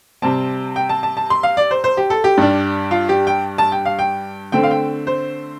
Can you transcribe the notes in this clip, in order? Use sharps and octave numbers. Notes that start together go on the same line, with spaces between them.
C3 G3 C4 A5
G5
A5
A5
A5
C6
F5
D5
C5
C5
G4
A4
G4
G2 G3 D4
F4
G4
G5
A5
G5
F5
G5
D3 A3 C4 G5
F5
G5
C5